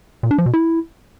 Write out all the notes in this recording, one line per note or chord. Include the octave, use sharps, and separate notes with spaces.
A#2
D4
F3
B2
E4